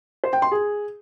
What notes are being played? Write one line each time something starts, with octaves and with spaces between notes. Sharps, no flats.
C5
G5
C6
G#4